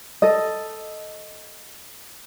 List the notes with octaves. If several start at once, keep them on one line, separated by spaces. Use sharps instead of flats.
A4 D#5